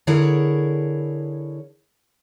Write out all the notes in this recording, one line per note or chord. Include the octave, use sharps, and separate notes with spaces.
D3 E4 G#4 A#4 C#5